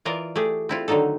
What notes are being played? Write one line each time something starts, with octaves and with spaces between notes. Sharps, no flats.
E3 F4 A#4 D5 D#5
A3 G4 G#4
C4 E4 F4
D3 D#3 F#3 D#4 A4